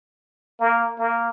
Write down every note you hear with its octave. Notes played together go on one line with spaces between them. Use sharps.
A#3
A#3